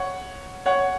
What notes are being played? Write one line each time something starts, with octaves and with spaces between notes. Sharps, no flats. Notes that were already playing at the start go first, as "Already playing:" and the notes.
Already playing: C#5 F#5
C#5 F#5